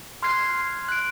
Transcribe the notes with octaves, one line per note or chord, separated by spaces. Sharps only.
C6 F6 F#6 G#6 C7
F#6 D7